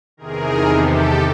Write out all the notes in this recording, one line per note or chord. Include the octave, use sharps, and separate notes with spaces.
E2 C3 D#3 G#4 A#4
G4 A4